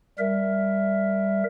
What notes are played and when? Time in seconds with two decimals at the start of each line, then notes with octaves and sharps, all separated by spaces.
0.18 G3 A#4 E5